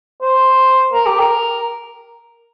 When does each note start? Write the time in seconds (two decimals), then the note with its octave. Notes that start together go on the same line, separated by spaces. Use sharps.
0.21 C5
0.93 A#4
1.06 G4
1.20 A#4